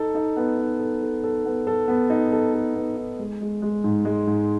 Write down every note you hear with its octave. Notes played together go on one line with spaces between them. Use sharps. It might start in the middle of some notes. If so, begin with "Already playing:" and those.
Already playing: D#4 A4
D#4
B3
D#4
A4
A4
A4
B3
A4
B3
D#4
A4
A4
B3
D#4
G#3
G#3
G#3
G#2
G#3
G#2